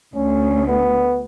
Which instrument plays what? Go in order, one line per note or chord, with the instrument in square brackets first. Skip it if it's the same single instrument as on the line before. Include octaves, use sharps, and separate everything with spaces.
[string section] D2 [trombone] C#4
[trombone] B3